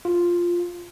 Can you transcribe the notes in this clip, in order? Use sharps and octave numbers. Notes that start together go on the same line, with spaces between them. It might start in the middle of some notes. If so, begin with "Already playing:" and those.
F4